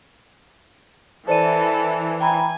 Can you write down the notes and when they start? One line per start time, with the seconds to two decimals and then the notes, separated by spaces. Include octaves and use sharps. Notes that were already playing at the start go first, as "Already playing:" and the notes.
1.28 E3 A4 C5 D5 D#7
2.20 G5 G#5 A#5 B5